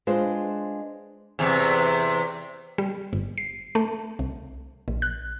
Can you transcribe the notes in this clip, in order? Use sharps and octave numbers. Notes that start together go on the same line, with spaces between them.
G#3 D4 F4 B4 C5
E2 C3
G3
G1
C7
A3
C2
A#1
F#6